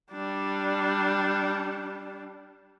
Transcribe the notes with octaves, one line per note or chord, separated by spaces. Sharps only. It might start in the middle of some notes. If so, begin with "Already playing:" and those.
G3 D4